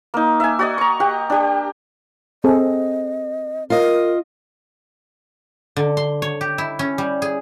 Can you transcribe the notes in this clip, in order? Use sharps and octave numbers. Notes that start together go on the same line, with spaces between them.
A#3 D#4
E5 G#5
F#4 D5 D#5
A#5 C#6
G4 F#5
D4 G4
C4 G#4 A4 D#5
F4 A#4 D#5
D3
C6
C#5
G4
E4
C#4
G3
G#4